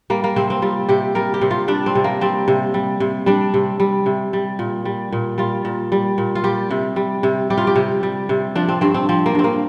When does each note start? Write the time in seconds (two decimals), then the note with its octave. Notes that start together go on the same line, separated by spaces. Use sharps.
0.10 G3 A#3
0.24 A#3
0.36 C3 C4
0.50 C4
0.62 G3 F4
0.89 C3 G4
1.15 G3 A#4
1.34 G4
1.41 C3
1.51 F4
1.68 G3 D4
1.86 C4
1.95 C3
2.04 A#3
2.21 G3 C4
2.48 C3
2.74 G3
3.00 C3
3.26 G3 D4
3.54 C3
3.80 G3
4.06 C3
4.33 G3
4.59 A#2
4.85 G3
5.13 A#2
5.38 G3 F4
5.65 A#2
5.92 G3
6.18 A#2
6.35 F4
6.44 G3 G4
6.71 C3
6.96 G3
7.23 C3
7.50 G3 G4
7.58 F4
7.67 G4
7.76 C3
8.03 G3
8.29 C3
8.56 F3 D4
8.69 C4
8.81 G2 C4
8.94 C4
9.09 F3 C4
9.26 A#3
9.35 G2 C4
9.44 A#3